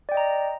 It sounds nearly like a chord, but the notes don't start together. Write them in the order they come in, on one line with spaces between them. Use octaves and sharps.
D5 G5 D#5 A#5